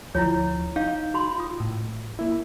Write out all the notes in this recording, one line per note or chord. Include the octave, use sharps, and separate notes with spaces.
D2 F3 E4 F4 C#5
D#4 F5 G6
F#4 B5 C6
F4 D#6
A2
A#3 E4